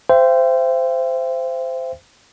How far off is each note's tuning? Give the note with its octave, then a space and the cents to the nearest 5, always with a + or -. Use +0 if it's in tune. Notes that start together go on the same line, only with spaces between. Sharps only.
C5 -15 E5 +40 G5 +15